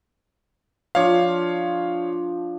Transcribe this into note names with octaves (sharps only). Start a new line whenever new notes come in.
F3 D4 C#5 F5